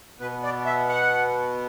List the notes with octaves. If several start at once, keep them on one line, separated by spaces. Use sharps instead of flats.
B2 B3 B4
D5
E5
F#5